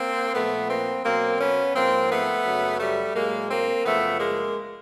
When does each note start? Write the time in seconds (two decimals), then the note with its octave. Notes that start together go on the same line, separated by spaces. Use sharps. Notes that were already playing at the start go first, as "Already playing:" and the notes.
Already playing: A#3 C4
0.35 A#2 F3 A3 B3
0.70 A#3 C4
1.05 B2 F#3 A#3 C4
1.39 B3 C#4
1.74 G#2 F3 A#3 C4
2.10 A3 B3
2.45 F#2 C#3 F#3
2.80 G3 A3
3.15 A2 F#3 G#3 A#3
3.49 A#3 C4
3.85 F#2 C#3 F3 A3 B3
4.19 G#3 A#3